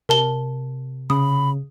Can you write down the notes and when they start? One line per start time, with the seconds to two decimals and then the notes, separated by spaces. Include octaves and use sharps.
0.09 C3 A#4 A5 G7
1.10 C#3 B5 D#6